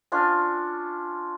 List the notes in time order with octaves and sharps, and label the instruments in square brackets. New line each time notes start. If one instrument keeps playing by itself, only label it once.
[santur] C#4 D4 F4